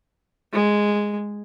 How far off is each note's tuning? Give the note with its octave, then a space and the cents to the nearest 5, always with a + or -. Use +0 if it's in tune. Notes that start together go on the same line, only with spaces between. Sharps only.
G#3 -5